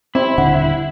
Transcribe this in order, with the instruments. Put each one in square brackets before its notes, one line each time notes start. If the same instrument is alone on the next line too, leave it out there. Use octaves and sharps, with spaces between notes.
[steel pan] C4 [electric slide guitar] E4
[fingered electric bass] D#1 D3 D4 [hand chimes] F#5